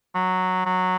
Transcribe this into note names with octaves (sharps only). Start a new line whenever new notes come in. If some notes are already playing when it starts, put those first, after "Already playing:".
F#3
F#3